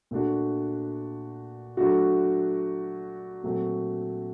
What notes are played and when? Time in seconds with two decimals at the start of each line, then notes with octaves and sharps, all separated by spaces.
0.11 A#2 A3 D4 F#4
1.77 F#3 A3 D4 F#4
3.44 A#2 F#3 A3 C4 F#4